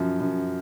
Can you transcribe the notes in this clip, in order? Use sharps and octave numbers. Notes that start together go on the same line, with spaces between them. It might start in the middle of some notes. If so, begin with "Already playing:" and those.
Already playing: F#2 F3
F#2